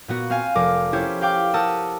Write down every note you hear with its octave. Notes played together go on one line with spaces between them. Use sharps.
A#2 B3 F#4
C4 F5 G#5
F1 A#4 D6
C#4 E4 G4 C5
G4 F5 G5 D6
G4 A#4 F#5 A5 D#6 E6